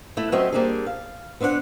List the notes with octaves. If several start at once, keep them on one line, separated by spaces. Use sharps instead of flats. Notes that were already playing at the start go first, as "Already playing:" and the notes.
A3 E4
F#3 A3 C4 C#4 D#5 E5
G3 A#3 C4 D4 D#4 G#4
F5
B3 C4 D4 E4 F#5